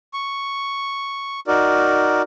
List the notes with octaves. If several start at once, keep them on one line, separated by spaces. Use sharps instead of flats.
C#6
D#4 F#4 A#4 D5